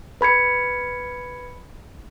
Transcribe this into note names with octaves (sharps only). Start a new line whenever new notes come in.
B4 B5 G#6 C#7